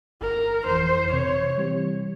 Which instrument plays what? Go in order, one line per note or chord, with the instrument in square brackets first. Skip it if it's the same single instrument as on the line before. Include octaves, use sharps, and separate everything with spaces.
[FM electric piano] G1 [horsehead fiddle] A#4
[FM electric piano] F2 E3 [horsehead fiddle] C5
[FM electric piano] C3 [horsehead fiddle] C#5
[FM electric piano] E3 G3 C4 G4